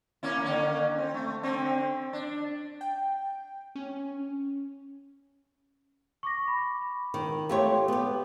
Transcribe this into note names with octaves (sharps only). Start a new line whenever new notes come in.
A#3 C#4 E4
D3 A#3 C#4
C4
A3
D3 C4
D4
G5
C#4
C#6 D6 A#6
B5 D6
D#3
A3 G4 C#5 F5 C6 D6
B3 G4